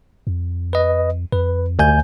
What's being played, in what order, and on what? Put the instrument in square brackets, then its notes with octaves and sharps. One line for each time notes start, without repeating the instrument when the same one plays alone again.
[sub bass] F2
[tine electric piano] B4 D#5
[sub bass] F2 [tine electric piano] B4
[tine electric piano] D2 G#5 G6